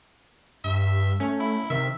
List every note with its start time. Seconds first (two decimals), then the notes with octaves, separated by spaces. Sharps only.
0.64 G2 E5
1.20 A3 C#4
1.40 E4
1.70 C3 D#3 E5